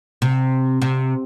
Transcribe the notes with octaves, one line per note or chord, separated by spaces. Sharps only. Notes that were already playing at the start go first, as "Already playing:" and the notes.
C3
C3